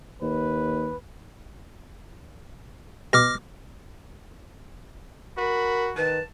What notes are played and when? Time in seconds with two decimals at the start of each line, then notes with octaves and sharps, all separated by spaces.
0.22 D#2 B4
3.13 B2 D6 F6 A#6
5.38 F#4 A#4 B5
5.97 D#3 B4 A5